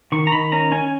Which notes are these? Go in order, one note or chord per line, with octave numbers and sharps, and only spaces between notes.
D#3 C#6
A#5
D#3 B5
C#4 A#5
C#4 G#5